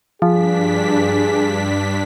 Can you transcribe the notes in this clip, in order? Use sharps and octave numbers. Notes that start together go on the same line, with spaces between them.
G2 F3 D4 G#4 B6